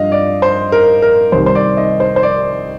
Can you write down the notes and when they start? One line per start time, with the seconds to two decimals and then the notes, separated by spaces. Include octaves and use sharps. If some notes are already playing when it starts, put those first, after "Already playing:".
Already playing: G2 F3 D#5 F5
0.12 D5
0.42 C5
0.72 A#4
1.02 A#4
1.32 C2 C3 D#3 C5
1.46 C5
1.55 D5
1.77 D#5
2.00 C5
2.16 C5
2.23 D5